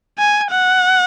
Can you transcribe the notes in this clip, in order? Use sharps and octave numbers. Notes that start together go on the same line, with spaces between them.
G#5
F#5